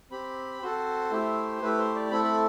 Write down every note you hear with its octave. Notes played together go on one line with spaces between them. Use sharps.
C4 G4 B5
C4 F#4 A4 C5
A3 E4 G4
A3 E4 G4 B4
C5
D5
A3 C4 E4 A4 B5
B5